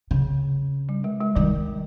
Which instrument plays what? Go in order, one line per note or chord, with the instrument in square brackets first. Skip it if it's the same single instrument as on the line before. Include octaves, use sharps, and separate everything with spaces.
[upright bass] C#3
[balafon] G3
G#3
G#3
[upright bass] D#3 [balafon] G3